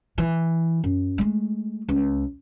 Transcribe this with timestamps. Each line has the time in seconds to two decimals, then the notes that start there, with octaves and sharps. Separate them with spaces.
0.18 E3
0.84 F#2
1.18 G#3 A3
1.88 C#2